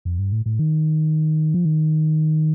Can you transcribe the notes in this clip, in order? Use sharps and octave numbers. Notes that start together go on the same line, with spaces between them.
F2
G2
A2
A2
D#3
F3
D#3